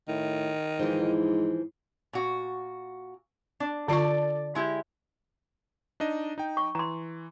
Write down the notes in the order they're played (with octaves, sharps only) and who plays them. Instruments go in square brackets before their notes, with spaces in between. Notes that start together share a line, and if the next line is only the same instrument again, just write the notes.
[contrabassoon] A2 [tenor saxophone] D#3
[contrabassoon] G#2 [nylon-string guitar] E3 F3
[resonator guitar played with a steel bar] A#2 F#4
D4
[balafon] D3 F4 C#6 [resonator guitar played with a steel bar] A4 D5
[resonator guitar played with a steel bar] G#3 E4 G4
[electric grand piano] D4 D#4 D#5
D#4 G5
[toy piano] C#6
[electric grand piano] E3 [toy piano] A#5 C6